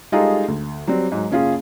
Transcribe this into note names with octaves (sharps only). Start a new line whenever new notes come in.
G3 G#3 D#4 F4 G#4 A4
D2
F#3 G3 C4 D5
G#2 F#3
F#1 C#4 F4 G#4